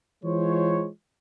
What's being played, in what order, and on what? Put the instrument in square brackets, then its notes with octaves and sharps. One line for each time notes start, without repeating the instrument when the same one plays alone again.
[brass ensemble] E3 G#3 F4 C5 C#5